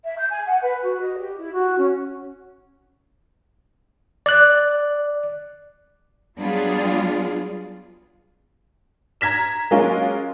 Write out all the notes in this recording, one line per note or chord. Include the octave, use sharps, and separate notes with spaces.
E5
G6
G#5
F#5
B4
F#4
D#5
G4
E4
F#4
C#4
D5 F#6
F#3 G3 B3 D4 F4 G#4
A#5 G#6 B6 E7
F#3 G#3 A#3 C#4 F4